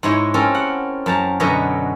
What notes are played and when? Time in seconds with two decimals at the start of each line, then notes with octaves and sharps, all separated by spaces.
0.03 G#2 G#3 E4 C#5
0.34 C4 C#4 A4 A#4
0.55 F#5
1.06 F#2 A5 A#5
1.40 F#2 B2 D3 B4 C#5 D#5